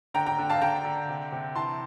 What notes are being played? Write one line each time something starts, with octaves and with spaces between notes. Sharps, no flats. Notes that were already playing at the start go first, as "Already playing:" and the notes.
D3 G5 A#5
G5 A#5
D3
F5 A5
D3 G5 A#5
D3
C3
C3
E3 A5 C6